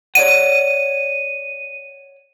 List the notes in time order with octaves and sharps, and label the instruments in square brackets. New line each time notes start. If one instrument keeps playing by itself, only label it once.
[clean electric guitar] C#5 D5 F#5 [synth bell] D#7